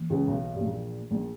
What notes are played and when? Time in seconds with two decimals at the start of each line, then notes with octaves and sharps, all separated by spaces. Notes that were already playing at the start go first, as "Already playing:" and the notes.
Already playing: E3 A#3
0.10 C#2 C#3
0.27 B1 B2
0.53 G2
0.60 A#1 A#2
1.11 A#1 A#2